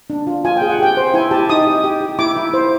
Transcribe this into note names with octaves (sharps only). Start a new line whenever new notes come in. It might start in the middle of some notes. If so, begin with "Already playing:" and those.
D4
F4
F4 G#5
G5
G#4
F#5
G4 G5
C5
E4 G#5
G4 A5
D#4 D#6
G4
G4
G4
E4 D6
E4
C5